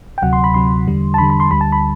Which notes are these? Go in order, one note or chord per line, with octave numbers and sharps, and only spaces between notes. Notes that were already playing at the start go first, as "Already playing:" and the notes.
G5
D2 C3 F#3 F#5
C6
B5
D2 C3 F#3 C6
E2 D3 G3
A5
E2 D3 G3 B5
B5
C6
D2 D3 G3 B5
A5
B5